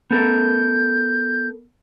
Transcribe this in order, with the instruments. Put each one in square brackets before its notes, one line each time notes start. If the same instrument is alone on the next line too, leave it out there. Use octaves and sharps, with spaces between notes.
[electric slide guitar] B3 A4 A#4 [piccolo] G6